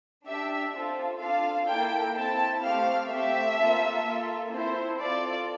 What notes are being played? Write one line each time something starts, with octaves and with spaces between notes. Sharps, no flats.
D4 G4 E5
C4 F4 A4
D4 F4 A4 F5
A#3 E4 A4 G5
C4 E4 A4 A5
A3 C4 G4 F5
A3 C4 G4 E5
A#3 F4 A4
A#3 F4 A4
C4 E4 A4 C5
C4 F4 A4 D5